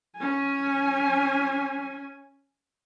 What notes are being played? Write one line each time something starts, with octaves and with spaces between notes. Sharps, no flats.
C#4 G#5